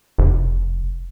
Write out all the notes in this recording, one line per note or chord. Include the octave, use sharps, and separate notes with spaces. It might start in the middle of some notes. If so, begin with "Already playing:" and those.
F1